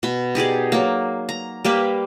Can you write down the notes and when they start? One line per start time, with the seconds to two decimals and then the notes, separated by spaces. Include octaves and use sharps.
0.03 B2 B5
0.35 D#4 G4 G#4 D5
0.72 F#3 A#3
1.29 A#5
1.65 G3 A#3 G4 B4